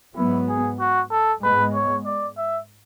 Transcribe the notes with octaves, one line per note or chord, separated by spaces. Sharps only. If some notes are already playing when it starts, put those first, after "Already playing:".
G#2 F#3 B3 E4
G#4
F#4
A4
G#2 G#3 B3 B4
C#5
D5
E5